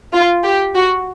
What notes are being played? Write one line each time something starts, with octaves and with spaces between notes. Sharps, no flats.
F4
G4
F#4